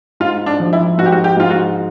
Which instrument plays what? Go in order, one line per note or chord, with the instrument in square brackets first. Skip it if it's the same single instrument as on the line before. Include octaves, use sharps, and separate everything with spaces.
[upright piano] G#2 [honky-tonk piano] F4
[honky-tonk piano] D4
[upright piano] F3
[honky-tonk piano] E4
[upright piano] G#2 [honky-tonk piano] F#4
[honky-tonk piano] G4
F#4
G4
[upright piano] G#2 [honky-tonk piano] F4
[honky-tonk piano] F#4